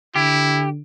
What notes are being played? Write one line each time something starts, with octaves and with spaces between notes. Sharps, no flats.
D3 E4 G4